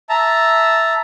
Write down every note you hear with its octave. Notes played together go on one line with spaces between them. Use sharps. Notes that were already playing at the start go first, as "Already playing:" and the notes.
E5 A5 A#5